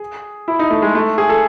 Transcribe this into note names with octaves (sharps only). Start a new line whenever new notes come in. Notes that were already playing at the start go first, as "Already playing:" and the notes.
Already playing: G#4
E4
D#4
A3
G#3
A3
G#4
A4